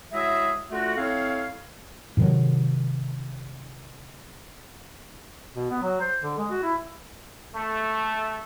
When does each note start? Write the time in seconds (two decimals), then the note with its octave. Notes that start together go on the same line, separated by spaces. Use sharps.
0.12 F#3 G#3 E4 G#4 D#5 E5
0.71 D3 A3 F4 F#4
0.96 A3 C4 E4 C#5 F5
2.17 G#2 C3 D#3 F#3
5.55 B2
5.70 B3
5.82 F#3
6.01 C5
6.22 D3
6.38 G#3
6.50 F#4
6.63 E4
7.55 A3